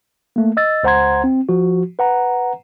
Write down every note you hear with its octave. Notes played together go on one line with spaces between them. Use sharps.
A3 A#3
D#5 E6 A6
C#2 C5 F#5 A#5 C6 G#6
C4
F3 F#4
B4 F#5 A#5